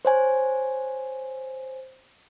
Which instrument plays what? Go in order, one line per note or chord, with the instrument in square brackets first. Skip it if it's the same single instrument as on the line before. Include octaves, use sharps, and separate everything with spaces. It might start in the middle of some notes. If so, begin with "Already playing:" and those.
[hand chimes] C5 C#5 G#5